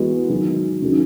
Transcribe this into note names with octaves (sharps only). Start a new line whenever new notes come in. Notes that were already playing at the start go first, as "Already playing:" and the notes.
Already playing: E3 G#3 B3 F#4
G#2 D#3 F#3
D#3 F#3 C#4 G#4